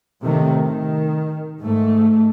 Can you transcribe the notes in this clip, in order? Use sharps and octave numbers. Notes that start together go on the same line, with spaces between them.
A2 C3 D#3 A3
D#3
G#2 A3